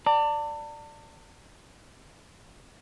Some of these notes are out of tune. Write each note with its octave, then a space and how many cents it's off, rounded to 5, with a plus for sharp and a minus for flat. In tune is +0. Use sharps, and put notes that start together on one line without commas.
D5 +0 A5 +40